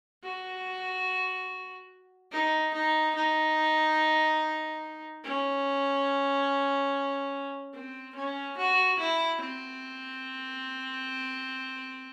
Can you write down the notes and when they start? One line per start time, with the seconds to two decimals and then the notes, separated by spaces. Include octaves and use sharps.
0.24 F#4
2.32 D#4
2.74 D#4
3.15 D#4
5.23 C#4
7.73 C4
8.15 C#4
8.57 F#4
8.99 E4
9.41 C4